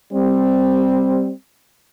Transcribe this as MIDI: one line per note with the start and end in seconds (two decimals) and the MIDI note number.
0.12 1.31 55
0.12 1.31 60